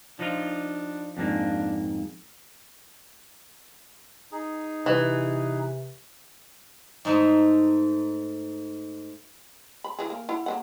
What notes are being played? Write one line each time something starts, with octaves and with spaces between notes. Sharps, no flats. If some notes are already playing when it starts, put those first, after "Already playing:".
F3 D4 D#4 F4
F2 G#2 A#3 D4
D#4 G#4
C3 E3
G#2 G#3 A3 D#4 E5
B5
E3 G#4
A#3
E4 F#5
A#3 C#4 F#5